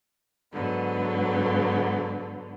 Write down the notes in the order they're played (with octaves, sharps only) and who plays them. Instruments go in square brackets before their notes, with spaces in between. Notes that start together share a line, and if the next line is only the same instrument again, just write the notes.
[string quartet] G#2 D3 F#3 B3